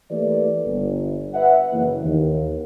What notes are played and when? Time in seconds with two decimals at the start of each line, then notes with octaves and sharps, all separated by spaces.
0.11 E3 A3 A#3 G4 B4 D5
0.66 G1
1.34 B4 E5 F#5
1.73 F#1 E3 A#3
2.05 D#2